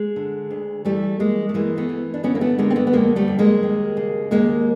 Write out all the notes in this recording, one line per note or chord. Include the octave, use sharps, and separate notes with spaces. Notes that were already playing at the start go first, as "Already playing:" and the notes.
Already playing: G#3
D3
D2
E3 G3 A3
E3 G#3 A#3
A3
E3 G#3 A#3
A3 B3
E3
D4
D3 B3 C#4
A#3
A3 B3
D3 G#3 A#3
C4
A3 B3
B3
F2 G#3 A#3
G3 A3
F2
G#3 A#3
D#2
C#3
D#2 G#3 A#3